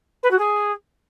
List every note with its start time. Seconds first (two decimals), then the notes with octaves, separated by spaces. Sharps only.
0.23 B4
0.31 F#4
0.38 G#4